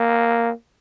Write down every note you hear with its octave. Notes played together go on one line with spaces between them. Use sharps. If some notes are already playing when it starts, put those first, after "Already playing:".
Already playing: A#3